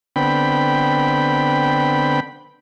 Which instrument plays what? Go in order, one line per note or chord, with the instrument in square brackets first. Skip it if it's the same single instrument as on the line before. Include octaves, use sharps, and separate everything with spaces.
[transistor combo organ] D3 B3 C4 G5 B5